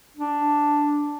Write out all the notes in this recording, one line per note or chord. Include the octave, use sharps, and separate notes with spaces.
D4